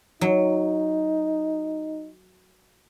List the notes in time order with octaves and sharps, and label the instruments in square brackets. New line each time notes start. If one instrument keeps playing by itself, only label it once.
[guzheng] F#3 [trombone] D#4